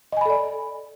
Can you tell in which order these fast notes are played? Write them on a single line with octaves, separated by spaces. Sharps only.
D#5 G#5 B5 A4 D5